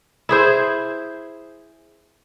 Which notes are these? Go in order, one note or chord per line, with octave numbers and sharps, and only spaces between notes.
E4 G#4 C5